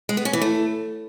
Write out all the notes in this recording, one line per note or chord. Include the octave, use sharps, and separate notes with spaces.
G#3
B3
C#4
E3
A3